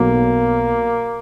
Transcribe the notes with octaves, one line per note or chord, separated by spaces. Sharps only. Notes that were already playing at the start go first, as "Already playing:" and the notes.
Already playing: B1 B2 F#3 A#3